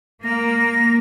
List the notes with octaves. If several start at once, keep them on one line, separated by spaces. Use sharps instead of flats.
A#3 A#6